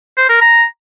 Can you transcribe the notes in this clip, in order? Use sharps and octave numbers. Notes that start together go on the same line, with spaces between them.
C5
A#4
A#5